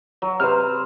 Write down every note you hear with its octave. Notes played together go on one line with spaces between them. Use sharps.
F#3
C3 B4 C5 F6